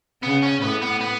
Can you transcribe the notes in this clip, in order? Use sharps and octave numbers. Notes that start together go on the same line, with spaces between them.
C#3 B3
C#4
A2 B3
B3
B3